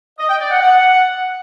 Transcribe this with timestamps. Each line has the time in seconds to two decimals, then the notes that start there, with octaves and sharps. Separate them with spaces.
0.18 D#5
0.29 G5
0.40 D5
0.51 F#5
0.62 F#5